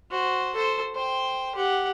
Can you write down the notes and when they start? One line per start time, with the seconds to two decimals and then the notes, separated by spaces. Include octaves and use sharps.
0.11 F#4 C5
0.55 A4 C5
0.95 C5 G5
1.55 G4 F#5